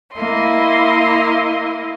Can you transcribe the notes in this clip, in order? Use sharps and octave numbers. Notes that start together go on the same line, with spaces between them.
A#3 E4 D#5 C6